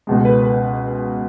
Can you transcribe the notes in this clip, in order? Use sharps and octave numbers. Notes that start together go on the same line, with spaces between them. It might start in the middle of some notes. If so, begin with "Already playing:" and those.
C#2 B2 G#3
B4
B4